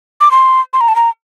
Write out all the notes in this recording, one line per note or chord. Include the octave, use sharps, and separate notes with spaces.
D6
C6
C6
A#5
A5
A#5